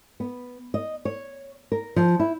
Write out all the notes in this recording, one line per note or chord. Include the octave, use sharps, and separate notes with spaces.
B3
D#5
C#5
A#4
F3
E4